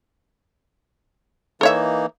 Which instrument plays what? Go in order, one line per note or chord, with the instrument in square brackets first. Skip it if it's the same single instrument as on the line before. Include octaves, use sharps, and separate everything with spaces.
[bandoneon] E3 A#3 D#4 [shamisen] A4 C#5 E5